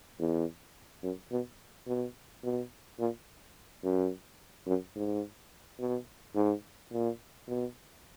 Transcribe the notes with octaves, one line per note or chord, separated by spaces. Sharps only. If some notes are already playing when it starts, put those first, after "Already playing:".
E2
F#2
B2
B2
B2
A#2
F#2
F#2
G#2
B2
G#2
A#2
B2